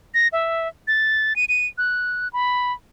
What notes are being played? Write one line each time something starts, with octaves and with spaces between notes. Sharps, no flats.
A#6
E5
A6
D#7
D#7
F#6
B5